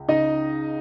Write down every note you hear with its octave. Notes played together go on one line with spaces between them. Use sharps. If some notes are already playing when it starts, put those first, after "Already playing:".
Already playing: C#2
C#3 D#4 D#5